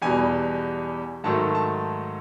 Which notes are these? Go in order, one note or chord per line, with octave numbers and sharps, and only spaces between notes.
E2 B2 G3 G#5
G#2 D#3 F#3 A3 A5
A5